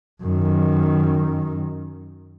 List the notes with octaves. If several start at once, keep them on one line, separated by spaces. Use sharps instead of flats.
F#2 D#3